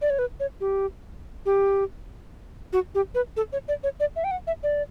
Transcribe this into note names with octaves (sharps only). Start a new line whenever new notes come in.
D5
C#5
B4
C#5
G4
G4
F#4
G4
B4
A4
C#5
D5
C#5
D5
E5
G5
F#5
E5
D5